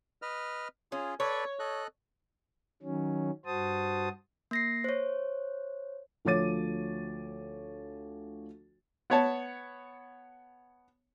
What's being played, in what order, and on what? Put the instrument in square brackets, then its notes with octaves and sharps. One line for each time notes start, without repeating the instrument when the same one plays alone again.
[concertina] B4 D#5 F6
[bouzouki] C#4 [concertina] F4 G#4
[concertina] A4 B4 D5 [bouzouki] C#5
[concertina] A4 D#5 F#6
[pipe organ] D#3 F#3 C#4
G2 F#4 C5 A5 D#6
[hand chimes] A#3 A#6 C7
C5 C#5
[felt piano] D2 F3 C#5 D6 A6 D#7
[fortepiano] B3 C#5 A5